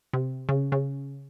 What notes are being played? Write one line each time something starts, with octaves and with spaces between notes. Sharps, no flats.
C3
C#3
C#3